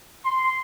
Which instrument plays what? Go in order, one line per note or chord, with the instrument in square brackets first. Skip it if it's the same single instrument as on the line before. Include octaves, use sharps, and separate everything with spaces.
[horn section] C6